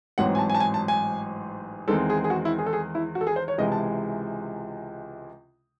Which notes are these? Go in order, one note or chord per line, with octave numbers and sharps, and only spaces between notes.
A1 G#2 F#3 C4 F#5
G#5
A5
G#5
A5
G#5
A5
G#5
E2 D#3 G#3 C4 A4
G#4
G#4
F#4
E4
G#4
A4
G#4
E4
F#4
A4
G#4
C5
C#5
C#2 C3 E3 G#3 D#5
A5